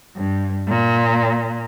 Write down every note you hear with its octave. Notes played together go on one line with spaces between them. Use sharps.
G2
A#2